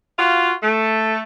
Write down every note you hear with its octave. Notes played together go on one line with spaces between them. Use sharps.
F4 F#4 F5
A3